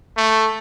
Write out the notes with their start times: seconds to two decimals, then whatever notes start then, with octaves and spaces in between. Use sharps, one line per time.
0.17 A3